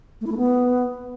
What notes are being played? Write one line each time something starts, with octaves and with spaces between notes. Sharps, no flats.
A3
E4
A3
B3